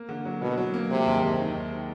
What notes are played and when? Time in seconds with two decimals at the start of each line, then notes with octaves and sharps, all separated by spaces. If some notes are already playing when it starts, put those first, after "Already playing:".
Already playing: A#3
0.09 D3
0.25 F#3
0.41 B2 F#3
0.58 F#3
0.74 A#3
0.90 C3 G#3
1.06 D#2
1.22 D#2
1.39 D#3
1.54 G#3